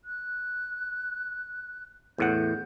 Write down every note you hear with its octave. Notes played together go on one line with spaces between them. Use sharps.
F#6
E2 A2 F#5 G6